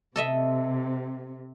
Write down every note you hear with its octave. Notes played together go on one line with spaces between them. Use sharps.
C3 A4 D#5 E5